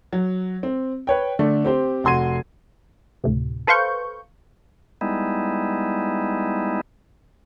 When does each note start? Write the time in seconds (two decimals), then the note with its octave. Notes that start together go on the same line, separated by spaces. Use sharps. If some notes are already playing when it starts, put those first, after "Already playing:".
0.13 F#3
0.63 C4
1.07 B4 C#5 G5
1.39 D3 A3 D4
1.65 C4 G4 C5
2.04 F1 F#4 C6 G#6 D#7
3.24 D2 A2 C3
3.67 A4 B4 C5 F5 C#6 G6
5.01 G3 G#3 B3 D#4 E4